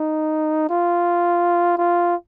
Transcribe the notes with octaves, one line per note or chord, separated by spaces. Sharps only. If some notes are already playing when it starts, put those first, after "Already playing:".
Already playing: D#4
F4
F4